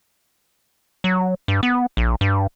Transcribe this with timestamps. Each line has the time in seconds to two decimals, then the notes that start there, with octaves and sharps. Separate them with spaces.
1.04 F#3
1.48 G2
1.63 B3
1.97 A#1
2.21 G2